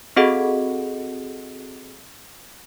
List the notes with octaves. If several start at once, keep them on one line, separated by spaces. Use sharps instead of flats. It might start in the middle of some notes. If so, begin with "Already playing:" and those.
C4 F#4 G#4 A4 D#5 F#5